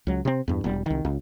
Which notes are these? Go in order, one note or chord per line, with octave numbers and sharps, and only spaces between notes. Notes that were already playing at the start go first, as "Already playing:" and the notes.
C#2 F#3
C3 C4
E2 G2
E1 G3
C2 D#3
C#2